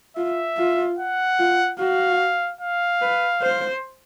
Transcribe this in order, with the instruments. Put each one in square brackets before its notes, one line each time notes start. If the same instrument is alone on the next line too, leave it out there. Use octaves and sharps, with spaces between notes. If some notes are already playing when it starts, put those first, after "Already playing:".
[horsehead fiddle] F4 [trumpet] E5
[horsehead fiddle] F4
[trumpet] F#5
[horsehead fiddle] F4
[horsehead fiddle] F#4 [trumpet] F5
[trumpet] F5
[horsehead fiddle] B4
C5